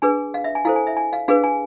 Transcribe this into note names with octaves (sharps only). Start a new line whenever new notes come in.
D4 G#4 B4 G#5
F5
E5
G#5
E4 A4 C5 F5
G#5
E5
G#5
F5
D4 G#4 B4 F5
G#5